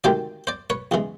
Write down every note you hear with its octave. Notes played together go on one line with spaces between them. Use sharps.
D2 C3 D#3 G#3 C5 D5
C5 D5
B4 C#5
E2 C#3 E3 G#3